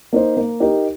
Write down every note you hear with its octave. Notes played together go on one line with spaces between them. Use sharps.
A#3 D#4 C5
A#3
D#4 G4 A#4